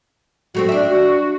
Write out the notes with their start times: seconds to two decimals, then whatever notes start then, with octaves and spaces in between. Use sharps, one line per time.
0.55 F#3 A3 C4 F#4
0.69 D4 E5
0.90 F#4